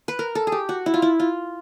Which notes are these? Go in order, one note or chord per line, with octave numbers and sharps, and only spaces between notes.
B4
A#4
A4
G#4
G4
F#4
E4
F4
E4
F4